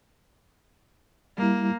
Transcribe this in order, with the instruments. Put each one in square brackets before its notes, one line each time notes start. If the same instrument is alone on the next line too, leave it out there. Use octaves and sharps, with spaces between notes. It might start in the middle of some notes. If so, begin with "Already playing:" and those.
[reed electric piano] G3 E4 [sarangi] A#3